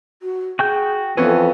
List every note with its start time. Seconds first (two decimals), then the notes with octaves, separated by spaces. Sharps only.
0.22 F#4
0.59 F#4 G#4 G5 G6
1.17 F2 E3 B3 C#4 A4 B4